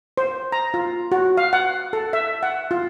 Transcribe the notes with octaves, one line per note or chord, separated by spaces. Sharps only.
C5
A#5
F4
F#4
F5
F#5
A4
E5
F#5
F4